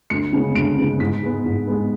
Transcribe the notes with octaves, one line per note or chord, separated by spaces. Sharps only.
D2 C#7
C#3 G#3 B3
D2 D7
C#3 G#3 B3
G#2 B6
G#3 B3
G#2
G#3 B3